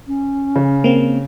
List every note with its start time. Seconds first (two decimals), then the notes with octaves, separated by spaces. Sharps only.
0.07 C#4
0.56 C#3
0.84 A#3 C4